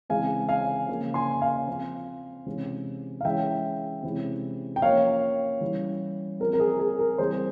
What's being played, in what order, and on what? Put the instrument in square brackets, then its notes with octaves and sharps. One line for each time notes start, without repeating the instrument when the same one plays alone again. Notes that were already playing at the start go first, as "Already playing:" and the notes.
[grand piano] C#3 E3 G#3 C4 F5 G#5
F5 G#5
C#3 F3 A#3
G#5 C6
F5 G#5
F3 C4
C3 E3 G#3 C#4
F5
E3 G#3 C#4 E5 G5
C3 E3 G#3 C#4
G5
F3 A#3 C#4 C#5 F5
E3 G3 C#4
F3 C4 A#4
A#4
G#4
G#4
A#4
E3 G3 C4 G#4 C5